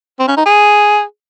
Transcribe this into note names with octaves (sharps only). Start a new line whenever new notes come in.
C4
C#4
D#4
G#4